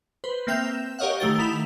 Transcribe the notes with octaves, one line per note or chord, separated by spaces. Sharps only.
B4 C5
A#3 C4 E5 G5 G6 F7
E7
G4 A#4 C#5 D#5 F5 F#5
D#3 A3 G4 A6
D#3 E4 B5 F7